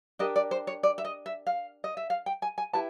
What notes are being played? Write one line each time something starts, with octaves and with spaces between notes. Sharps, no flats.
D4 G4 A#4 D#5
D5
C5
C#5
D5
E5
D#5
E5
F5
D#5
E5
F5
G5
G#5
G#5
E4 G4 B4 A5